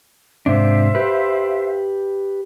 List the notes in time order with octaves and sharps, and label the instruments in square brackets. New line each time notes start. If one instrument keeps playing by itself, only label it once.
[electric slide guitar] G#2 C3 D4 [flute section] C5 E5 F5
[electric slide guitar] G4 B4